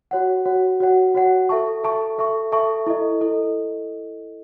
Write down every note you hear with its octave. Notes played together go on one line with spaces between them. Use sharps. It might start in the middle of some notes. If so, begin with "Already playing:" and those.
F#4 C#5 F#5
F#4 C#5 F#5
F#4 C#5 F#5
F#4 C#5 F#5
A4 E5 A5 C#6
A4 E5 A5 C#6
A4 E5 A5 C#6
A4 E5 A5 C#6
E4 A4 D#5
E4 A4 D#5